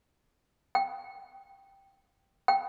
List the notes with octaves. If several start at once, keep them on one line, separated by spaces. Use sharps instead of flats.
G5
G5